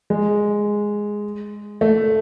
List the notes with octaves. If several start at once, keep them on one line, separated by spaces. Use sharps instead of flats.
G#3
A3